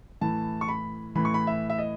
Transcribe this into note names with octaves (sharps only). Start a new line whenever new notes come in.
A2 E3 A5
C#6
B5
A2 E3 B5
C#6
B5
E5
E5
D#5